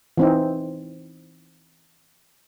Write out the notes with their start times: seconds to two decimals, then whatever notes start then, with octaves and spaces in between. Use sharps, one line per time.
0.17 E3 C4 D#4